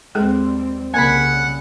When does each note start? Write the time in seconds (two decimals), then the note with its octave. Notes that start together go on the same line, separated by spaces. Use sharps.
0.15 D#2 G3 G#3 C4 G#4 A4
0.94 C2 C#3 G3 A#3 A#4 F#5 G#5 B5